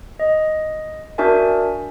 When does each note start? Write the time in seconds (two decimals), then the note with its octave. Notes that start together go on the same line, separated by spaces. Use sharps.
0.20 D#5
1.18 D4 F#4 A#4 D5 E5 G#5